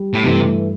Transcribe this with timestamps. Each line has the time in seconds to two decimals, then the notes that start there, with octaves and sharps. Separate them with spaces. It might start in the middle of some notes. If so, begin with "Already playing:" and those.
Already playing: G3
0.14 A2
0.25 G2 C3 E3 A3 E4